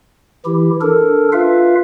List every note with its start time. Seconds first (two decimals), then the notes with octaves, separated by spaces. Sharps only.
0.45 E3 E4 G4
0.81 D4 A4 A#4
1.33 F4 B4 E5 F5